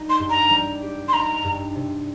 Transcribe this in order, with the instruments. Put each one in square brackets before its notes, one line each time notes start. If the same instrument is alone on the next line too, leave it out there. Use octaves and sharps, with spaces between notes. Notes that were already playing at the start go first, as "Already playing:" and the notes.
Already playing: [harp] G3 D#4
[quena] C6
[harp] G2
[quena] A#5
[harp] G3
G4
[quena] C6
[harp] D#4 [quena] A#5
[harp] G2
C3